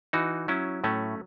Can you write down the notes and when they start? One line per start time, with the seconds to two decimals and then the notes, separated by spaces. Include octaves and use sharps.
0.13 E3 D#4 F#4
0.48 F#3 C#4 E4
0.84 A2 A3 C#4